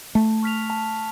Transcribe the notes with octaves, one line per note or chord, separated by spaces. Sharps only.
A3 A5
C#6 F6 B6 F7
A5